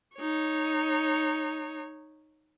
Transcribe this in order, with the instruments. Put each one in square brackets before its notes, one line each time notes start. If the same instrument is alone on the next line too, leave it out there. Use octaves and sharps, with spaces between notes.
[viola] D#4 C#5